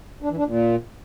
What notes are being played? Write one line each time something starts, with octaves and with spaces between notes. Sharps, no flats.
D4
E3
D4
A#2